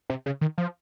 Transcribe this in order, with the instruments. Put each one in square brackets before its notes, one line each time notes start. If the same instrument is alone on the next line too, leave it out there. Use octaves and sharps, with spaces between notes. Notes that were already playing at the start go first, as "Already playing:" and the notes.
[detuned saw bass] C3
C#3
D#3
F3